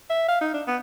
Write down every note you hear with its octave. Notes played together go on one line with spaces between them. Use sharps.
E5
F5
D#4
D4
B3